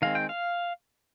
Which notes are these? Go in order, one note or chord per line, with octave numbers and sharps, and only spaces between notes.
D#3 G#3 C4 F5
G5
F5